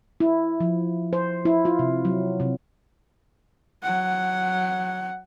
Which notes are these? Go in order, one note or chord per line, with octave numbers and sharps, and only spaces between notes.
E4
F3
C5
E4
F4
C3
F#3
C3
F#3 F#5